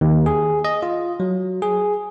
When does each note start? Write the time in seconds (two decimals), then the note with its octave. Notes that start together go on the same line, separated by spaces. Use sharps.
0.01 D#2
0.26 G#4
0.65 D#5
0.83 F4
1.20 F#3
1.62 G#4